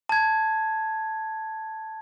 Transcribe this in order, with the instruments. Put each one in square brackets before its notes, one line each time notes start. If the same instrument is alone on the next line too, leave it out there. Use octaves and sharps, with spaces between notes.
[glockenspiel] A5 G#6